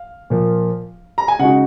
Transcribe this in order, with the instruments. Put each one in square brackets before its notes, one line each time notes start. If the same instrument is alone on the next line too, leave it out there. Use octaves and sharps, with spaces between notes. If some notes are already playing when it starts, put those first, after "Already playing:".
Already playing: [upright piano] F5
[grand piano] A#2 F3 A#3
[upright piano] A#5
G#5
[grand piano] C#3 G#3 D#4 F#4 [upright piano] F#5